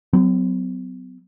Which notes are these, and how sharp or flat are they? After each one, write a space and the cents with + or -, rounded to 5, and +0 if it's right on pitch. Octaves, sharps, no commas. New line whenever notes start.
F#3 +5 B3 +45